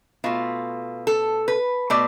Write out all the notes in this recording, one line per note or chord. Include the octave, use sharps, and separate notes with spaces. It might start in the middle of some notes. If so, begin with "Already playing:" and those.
B2 A3 F4
A4
B4
B2 A3 D5